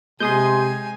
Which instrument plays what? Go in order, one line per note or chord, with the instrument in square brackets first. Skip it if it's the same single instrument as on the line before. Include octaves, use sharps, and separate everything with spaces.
[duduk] C3 [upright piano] G#3 [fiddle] G#5 [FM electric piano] C6 D#6 G6